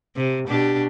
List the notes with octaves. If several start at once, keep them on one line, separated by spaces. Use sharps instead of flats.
C3
B2 D4 G4